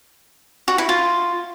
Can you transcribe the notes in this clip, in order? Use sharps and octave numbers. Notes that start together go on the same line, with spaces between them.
F#4
E4
F4